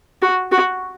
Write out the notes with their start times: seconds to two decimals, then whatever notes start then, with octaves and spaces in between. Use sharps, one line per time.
0.22 F#4
0.51 F#4